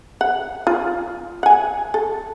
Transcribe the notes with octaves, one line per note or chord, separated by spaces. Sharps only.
F#5
F4
F#5 G#5
A4